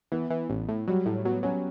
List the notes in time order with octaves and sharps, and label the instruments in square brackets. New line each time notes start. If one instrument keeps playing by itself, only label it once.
[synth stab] E3 [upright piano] B3
[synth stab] E3
A1
A2
[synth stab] F#3 [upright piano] G3
[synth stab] A2
[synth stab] F#3 [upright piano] B3
[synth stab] F#3 [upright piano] C#4